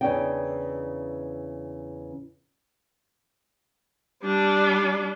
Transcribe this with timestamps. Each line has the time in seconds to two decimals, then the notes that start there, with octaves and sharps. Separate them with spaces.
0.01 E2 C#3 E3 C#4 D4 G5
4.23 G3 D4